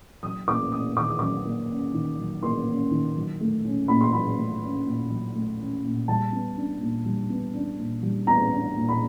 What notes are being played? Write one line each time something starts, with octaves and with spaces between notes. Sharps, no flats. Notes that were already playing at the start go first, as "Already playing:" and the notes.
F#3 D#6
A#3 D6
C#4 D#6
D#3 D6
D#6
F#3 D6
A#3
C#4
D#3
F#3
A#3 C6
C#4
D#3
F#3
A3
C#4
A#2 B5
C6
F#3 B5
A3
C#4
A#2
F#3
A3
C#4
A#2
G3 A5
B3
D4
A#2
G3
B3
D4
A#2
G3
B3 A#5
D4
A#2
B5